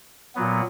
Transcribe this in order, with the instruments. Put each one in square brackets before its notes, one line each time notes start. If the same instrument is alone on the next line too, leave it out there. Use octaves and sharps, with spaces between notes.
[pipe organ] A#2 F#3 B3